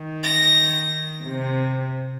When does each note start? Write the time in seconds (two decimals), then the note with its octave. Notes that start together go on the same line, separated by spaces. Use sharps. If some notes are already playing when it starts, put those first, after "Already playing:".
Already playing: D#3
0.24 A#6
1.24 C3